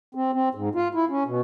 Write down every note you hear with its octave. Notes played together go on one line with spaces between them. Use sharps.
C4
C4
G#2
F4
E4
C#4
B2